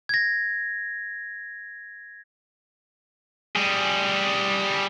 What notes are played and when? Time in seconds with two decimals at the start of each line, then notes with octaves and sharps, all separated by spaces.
0.09 G#6 A#6
3.56 G3 G#4